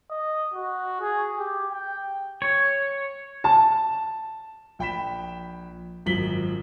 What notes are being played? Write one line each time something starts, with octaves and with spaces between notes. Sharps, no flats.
D#5
F#4
G#4
G4
G5
C#5
A5
A#1 G5 B5 B6 E7
G#1 F#2 F3 B6 F#7 G7